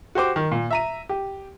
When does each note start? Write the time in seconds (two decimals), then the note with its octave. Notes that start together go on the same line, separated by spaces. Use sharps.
0.15 F#4 G4 C5 D6
0.36 D#3
0.52 A#2
0.71 E5 A#5 D#7
1.09 G4